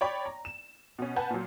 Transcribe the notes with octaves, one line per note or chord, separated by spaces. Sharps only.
C#5 D5 G5 B5 C#6
A#5
E7
B2 C#4
B4 F#5 G#5 A5 G6
A#2 F#3